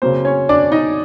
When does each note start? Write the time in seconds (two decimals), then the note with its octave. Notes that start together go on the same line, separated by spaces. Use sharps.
0.02 C#3 F#3 A#3 C4 C5
0.25 C#4 C#5
0.49 D4 D5
0.72 D#4 D#5